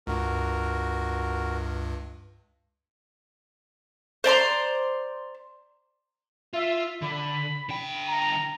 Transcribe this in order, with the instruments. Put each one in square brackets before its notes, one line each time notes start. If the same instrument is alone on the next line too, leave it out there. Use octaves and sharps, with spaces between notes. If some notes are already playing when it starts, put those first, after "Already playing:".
[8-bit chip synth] C#2 G2 [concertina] F#4 A#4
[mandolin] C5 D5 A#5 C6
[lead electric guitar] F4 [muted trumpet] E5
[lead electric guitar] D3 [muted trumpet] B5
[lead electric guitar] D3 G5
[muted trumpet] A#5